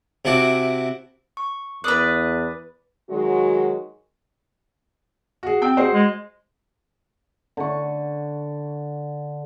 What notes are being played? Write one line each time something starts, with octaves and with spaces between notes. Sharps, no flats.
C3 E4 F#4 F#5 A5 D6
C#6
E2 B4 D5 D#6 F#6
D#3 F#3 G#3 F#4
F#4 G#4
C4 G5
F#4 G#4 C5
G#3
D3 C#6